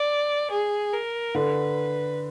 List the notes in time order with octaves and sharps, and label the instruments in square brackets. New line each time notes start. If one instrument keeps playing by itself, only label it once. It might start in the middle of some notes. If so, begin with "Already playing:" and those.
Already playing: [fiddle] D5
G#4
A#4
[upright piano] D3 [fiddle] B4